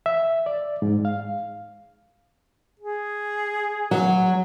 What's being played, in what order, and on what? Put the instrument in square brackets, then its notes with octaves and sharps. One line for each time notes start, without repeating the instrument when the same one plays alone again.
[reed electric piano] E5
D5
G#2
F5
[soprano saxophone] G#4
[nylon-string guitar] F#3